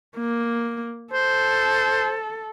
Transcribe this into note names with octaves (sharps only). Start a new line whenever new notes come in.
A#3
A4 C5